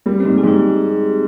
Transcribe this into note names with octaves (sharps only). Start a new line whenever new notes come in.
G3 A#3
G#2 C4
G#4
G#2 G4